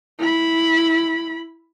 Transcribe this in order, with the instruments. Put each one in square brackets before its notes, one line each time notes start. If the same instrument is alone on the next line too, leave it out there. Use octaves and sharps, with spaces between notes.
[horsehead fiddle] E4 B5